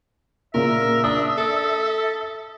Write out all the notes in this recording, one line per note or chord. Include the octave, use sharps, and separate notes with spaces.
A#2 C#3 A#4 E5
D4 D#6
A4